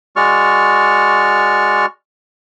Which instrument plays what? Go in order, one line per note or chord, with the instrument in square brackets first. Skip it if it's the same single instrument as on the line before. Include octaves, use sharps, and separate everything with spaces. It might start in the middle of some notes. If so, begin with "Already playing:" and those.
[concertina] G#3 F#4 D5 C#6 F6